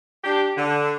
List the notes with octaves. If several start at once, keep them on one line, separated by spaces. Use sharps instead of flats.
D4 G4
D3